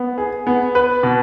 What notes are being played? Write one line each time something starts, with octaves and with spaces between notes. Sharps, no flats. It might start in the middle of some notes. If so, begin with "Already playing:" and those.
Already playing: B3
G#4
B3
B4
B2